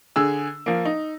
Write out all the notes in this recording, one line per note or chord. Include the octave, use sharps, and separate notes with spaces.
D3 G#4 E6
F3 A#3
D#4